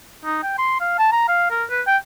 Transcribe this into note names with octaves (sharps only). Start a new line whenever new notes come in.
D#4
G5
C6
F5
A5
A#5
F5
A#4
B4
G5